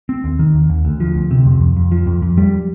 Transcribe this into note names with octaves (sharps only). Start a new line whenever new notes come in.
C4
D#2
D#3
D#2
D#2
D2
F3
D2
C3
F2
F2
F2
F3
F2
F2
G3